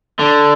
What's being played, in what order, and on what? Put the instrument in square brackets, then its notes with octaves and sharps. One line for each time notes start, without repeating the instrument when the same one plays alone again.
[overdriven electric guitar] D3